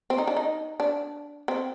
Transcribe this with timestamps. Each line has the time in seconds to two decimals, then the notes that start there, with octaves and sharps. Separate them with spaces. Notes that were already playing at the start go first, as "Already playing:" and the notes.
0.10 C4
0.18 D#4
0.27 D4
0.37 D#4
0.80 D4
1.48 C4